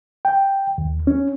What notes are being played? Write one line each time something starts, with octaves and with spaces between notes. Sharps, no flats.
G5
D#2
C#4